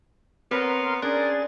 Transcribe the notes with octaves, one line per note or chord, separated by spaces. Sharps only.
B3 C4 A#4 B4 C#5 A#5 C6 F6
C#4 D4 G#4 A#4 F#6 A6